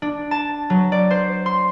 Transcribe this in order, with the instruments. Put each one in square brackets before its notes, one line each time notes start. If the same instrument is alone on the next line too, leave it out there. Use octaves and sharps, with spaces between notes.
[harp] D4
A5
F#3
D5
C5
C6